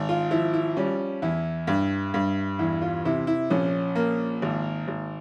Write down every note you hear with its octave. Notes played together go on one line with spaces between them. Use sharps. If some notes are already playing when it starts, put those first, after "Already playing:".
Already playing: G#1
F4
F3 E4
E4
G3 C#4
E2 E4
G2
G2
E2 E4
F4
C3 E4
E4
A#1 C#4
A#3
G#1
G#1